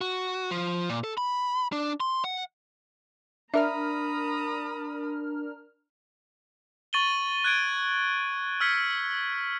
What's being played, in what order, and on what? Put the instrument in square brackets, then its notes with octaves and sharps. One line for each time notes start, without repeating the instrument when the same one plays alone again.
[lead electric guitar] F#4
F3
A#2
A4
B5
D4
C6
F#5
[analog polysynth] D4 A#4 F6 [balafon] E5 [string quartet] A#5 B5 D#6
[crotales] C#6 A6 D#7 F#7 G7
F#6 G#6 D7
E6 F6 G#6 B6 C#7